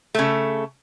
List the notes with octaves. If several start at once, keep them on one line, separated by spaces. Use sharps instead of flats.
C#3 A3